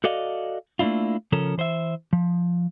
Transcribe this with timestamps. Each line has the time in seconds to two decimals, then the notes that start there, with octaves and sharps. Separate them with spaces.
0.04 F#4 A4 D5 D#5 F5
0.79 A3 A#3 D4 E4 F4
1.32 C#3 F3 C#4 A4 A#4
1.58 E3 C5 D#5 E5
2.13 F3